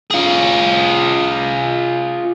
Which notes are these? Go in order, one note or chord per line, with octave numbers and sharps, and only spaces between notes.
F4 G#4